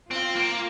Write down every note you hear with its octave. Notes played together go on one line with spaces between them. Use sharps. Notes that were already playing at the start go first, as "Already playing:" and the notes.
C4 F4
A#3